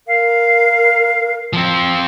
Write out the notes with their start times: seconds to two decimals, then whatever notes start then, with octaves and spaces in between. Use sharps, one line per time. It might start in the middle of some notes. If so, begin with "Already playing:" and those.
0.08 A#4 F5
1.53 F3 C4